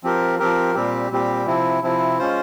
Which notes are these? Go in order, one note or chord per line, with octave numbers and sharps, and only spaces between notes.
F3 C4 G4 A#4
F3 C4 G4 A#4
A#2 G3 C4 G4
A#2 G3 C4 G4
C3 F3 C4 E4
C3 F3 C4 E4
G#3 C#4 F4 C5